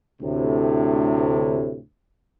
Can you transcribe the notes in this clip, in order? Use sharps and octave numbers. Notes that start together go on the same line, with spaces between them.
D2 A2 C3